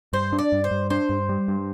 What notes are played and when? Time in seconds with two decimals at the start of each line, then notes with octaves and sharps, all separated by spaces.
0.13 G2 C5
0.33 D4
0.39 D5
0.52 G2
0.64 C5
0.71 G2
0.90 D4 C5
1.09 G2
1.29 G3
1.48 G2